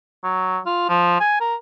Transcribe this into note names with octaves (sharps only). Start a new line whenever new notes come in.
F#3
F4
F3
G#5
A#4